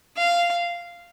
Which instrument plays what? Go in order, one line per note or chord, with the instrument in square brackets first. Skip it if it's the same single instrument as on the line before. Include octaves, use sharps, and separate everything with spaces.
[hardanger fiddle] F5